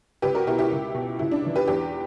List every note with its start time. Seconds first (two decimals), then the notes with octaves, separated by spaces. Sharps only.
0.22 C#2 G4 B4
0.35 F#4 A#4
0.47 B2 E4 G4
0.58 E4 G4
0.71 C#2
0.95 B2
1.19 C#2 E4
1.31 D4
1.43 C#3 E3
1.56 G4 B4
1.67 E2 G4 B4